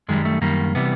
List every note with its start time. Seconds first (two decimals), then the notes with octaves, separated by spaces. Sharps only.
0.09 F#2 D#3 G3 G#3
0.25 A3
0.41 F#2 D#3 G3 A#3
0.75 C3 E3 G3 B3